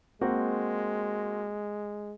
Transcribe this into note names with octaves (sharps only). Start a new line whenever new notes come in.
G#3 A#3 C4 F#4